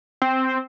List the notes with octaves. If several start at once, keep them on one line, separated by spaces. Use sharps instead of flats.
C4